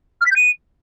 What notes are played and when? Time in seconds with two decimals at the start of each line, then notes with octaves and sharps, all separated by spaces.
0.21 F6
0.26 B6
0.31 G6
0.36 D#7